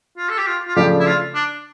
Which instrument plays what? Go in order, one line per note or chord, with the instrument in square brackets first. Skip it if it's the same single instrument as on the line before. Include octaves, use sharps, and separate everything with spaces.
[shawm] F4
A4
G4
F4
F4
[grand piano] C#3 F3 A3 D4 [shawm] G4
[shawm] E4
F4
D4